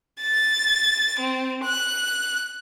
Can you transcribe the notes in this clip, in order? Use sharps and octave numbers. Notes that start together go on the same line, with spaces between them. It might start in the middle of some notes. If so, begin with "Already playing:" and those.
A6
C4
F#6